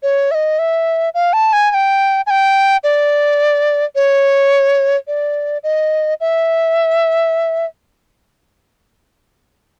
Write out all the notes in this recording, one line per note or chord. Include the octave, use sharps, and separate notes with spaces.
C#5
E5
D#5
E5
F5
A5
G#5
G#5
G5
G#5
G5
D5
C#5
D5
D#5
E5